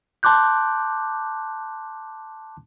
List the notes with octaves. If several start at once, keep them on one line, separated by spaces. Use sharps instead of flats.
A5 C6 D6 F#6 G6